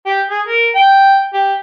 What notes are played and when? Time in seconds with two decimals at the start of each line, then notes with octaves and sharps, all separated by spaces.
0.06 G4
0.30 G#4
0.47 A#4
0.75 G5
1.33 G4